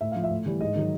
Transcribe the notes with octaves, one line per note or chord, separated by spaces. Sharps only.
A2 E5
F3 F5
E5
A2
E3 G3
G#2 D#5
D#3 F#3